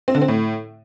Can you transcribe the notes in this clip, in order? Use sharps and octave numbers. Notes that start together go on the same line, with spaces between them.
C4
D3
C4
A2